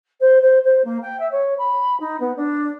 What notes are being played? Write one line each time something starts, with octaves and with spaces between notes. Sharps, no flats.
C5
C5
C5
A#3
G5
E5
C#5
B5
D#4
B3
D4